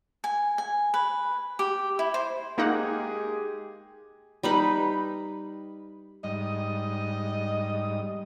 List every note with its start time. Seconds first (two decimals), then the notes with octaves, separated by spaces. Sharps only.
0.24 G#5
0.58 G#5
0.94 B4
1.59 G4
1.99 E4
2.14 C5
2.58 G#3 A#3 D#4 G4 G#4 F#5
4.43 G3 D#4 B4
6.24 G#2 G3 D#5 D#6